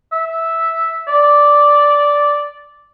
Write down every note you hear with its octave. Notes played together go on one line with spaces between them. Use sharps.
E5
D5